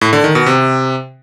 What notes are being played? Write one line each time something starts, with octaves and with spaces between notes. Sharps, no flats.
A2
D3
D#3
B2
C3